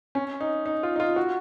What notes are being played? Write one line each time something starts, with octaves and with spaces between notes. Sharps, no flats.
C#4
D#4
D#4
F4
D#4
F4
F#4